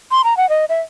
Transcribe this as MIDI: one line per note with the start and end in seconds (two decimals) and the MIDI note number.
0.11 0.22 84
0.24 0.36 82
0.37 0.49 78
0.49 0.65 75
0.69 0.80 76